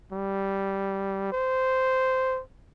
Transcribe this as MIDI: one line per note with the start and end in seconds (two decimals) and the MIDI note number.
0.12 1.30 55
1.32 2.41 72